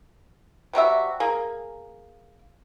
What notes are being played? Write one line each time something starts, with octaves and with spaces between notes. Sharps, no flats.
C3 G3 F#4 E5
A#3 G#4